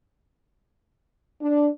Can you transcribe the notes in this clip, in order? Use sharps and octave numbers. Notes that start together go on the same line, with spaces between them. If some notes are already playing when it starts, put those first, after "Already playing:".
D4